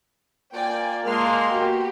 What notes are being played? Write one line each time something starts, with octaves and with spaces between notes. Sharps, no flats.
A#3 F4 D5 G5 G#5
G#3 A#3 A5 C6 F6
B3 F#4 G4